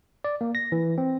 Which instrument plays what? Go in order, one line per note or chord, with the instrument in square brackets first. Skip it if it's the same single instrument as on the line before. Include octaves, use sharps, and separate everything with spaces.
[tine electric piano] D5
A#3
A#6
E3
C4